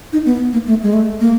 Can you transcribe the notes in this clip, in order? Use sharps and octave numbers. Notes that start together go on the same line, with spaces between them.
D#4
B3
A#3
A3
G#3
A3
A#3